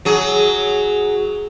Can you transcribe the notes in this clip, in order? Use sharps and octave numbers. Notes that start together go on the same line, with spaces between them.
F#3 G#4